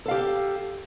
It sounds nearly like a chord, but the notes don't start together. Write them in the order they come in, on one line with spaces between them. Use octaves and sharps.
A4 F5 G4